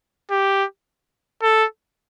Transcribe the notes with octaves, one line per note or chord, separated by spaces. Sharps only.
G4
A4